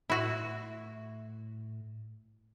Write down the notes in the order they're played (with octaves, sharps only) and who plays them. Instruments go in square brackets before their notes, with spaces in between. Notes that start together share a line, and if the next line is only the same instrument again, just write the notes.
[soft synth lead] A2 [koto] E4 F#4